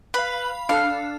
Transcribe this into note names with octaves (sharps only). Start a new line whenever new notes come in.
B4 F5 B5
D4 A4 F5